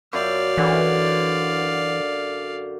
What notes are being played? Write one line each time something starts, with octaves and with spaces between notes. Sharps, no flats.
F#2 D5 E5 F5
D3 E3 C#4